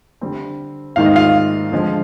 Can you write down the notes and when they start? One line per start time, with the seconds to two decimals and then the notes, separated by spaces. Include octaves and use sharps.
0.21 D3 G3 C4
0.96 G#2 D#3 G#3 C4 F5
1.06 D#5
1.15 F4 F5
1.72 D3 F3 G#3 C4